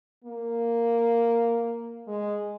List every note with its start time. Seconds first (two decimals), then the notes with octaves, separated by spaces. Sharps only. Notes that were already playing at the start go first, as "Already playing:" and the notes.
0.24 A#3
2.07 G#3